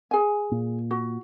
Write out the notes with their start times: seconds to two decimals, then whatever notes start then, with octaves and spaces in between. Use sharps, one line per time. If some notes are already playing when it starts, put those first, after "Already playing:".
0.11 G#4 G#5
0.51 A#2
0.91 F#4